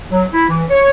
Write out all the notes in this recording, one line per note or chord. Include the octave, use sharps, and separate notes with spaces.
F#3
E4
E3
C#5